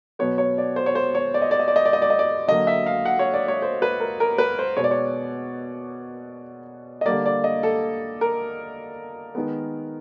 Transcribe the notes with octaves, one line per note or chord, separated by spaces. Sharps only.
B2 F#3 B3 C#5
C#5
D5
C5
C#5
C5
C#5
D5
D#5
D5
D#5
D5
D#5
D5
D#5
D5
D#5
D5
D3 F#3 A#3 D#5
E5
F5
F#5
C#5
D5
C#5
C5
B4
A#4
A#4
B4
C5
B2 G#3 B3 C#5
D5
C#5
D#5
D3 G3 A#3 D5
D5
D#5
A4
A#4
D#3 G#3 B3